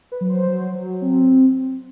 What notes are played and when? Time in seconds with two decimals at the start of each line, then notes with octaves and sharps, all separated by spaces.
0.12 B4
0.21 F#3
0.29 C5
0.47 F#3
0.74 F#3
1.02 C4